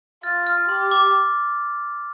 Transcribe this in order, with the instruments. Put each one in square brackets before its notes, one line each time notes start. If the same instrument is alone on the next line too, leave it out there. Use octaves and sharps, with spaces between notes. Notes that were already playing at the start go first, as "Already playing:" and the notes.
[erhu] F4 [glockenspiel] F6 A6
[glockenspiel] F6
[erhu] G4 [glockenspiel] C6
[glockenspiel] D6